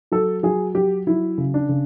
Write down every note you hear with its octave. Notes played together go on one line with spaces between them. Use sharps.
F#3 A4
F#3 G#4
F#3 G4
F#3 E4
C#3
D4
C#3